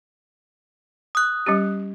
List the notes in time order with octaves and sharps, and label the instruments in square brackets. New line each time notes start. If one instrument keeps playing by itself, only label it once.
[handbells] D#6 F#6
[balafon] G3 C#4 G4